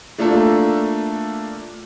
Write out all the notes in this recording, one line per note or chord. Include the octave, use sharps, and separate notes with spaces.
A3 A#3 D4 F4 A4